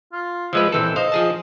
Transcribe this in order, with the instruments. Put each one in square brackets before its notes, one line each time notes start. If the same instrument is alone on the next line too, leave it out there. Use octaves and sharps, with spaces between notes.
[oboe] F4
[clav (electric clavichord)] F3 G#3 B4 [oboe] E5
[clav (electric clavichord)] A#1 E3 A4 [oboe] C4
[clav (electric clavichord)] C5 F5 [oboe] D#5
[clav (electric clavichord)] F3 G#4 A5